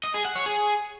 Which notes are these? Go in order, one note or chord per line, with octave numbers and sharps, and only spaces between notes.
D#5
G#4
F#5
C#5
G#4